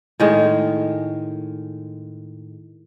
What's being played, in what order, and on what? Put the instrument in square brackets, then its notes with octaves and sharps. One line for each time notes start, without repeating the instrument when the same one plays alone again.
[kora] A2 D#3 G#3